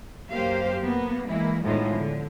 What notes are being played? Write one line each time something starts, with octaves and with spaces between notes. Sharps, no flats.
F#2 A#3 G4 C5 F5
A#3 B3
E3 G#3 A#3 E4
A2 D#3 F3 G#3 B3 F4
D3